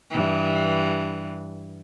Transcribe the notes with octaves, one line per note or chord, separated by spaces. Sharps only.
G2 E3